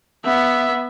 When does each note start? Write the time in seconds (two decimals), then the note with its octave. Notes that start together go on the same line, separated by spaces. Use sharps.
0.25 B3 E5